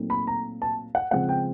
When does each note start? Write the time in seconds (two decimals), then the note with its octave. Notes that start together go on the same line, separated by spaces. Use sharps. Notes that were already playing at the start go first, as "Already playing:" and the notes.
Already playing: A#2 F#3 A3 C4 D#4
0.10 B5
0.27 A#5
0.62 A5
0.95 F#5
1.11 C#3 F3 G#3 C4 F#5
1.29 G5